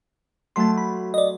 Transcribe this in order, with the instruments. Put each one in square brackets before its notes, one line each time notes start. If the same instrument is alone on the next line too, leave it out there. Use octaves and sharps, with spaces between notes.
[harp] F#3 A3 [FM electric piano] A5 C6
[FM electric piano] B5
D5 D#5